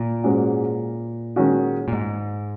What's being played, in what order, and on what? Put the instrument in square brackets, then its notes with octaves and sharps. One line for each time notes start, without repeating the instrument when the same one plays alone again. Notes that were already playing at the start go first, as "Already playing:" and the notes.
Already playing: [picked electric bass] A#2
[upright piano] G#2 G#3 C#4 F#4
D#3 G#3 C#4 F#4
[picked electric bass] A#2
G#2